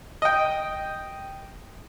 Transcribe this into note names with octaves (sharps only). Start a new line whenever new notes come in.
D#5 G5